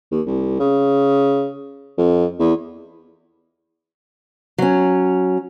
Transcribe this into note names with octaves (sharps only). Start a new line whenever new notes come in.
D#2
C2
C#3
F2
E2
F#3 C#4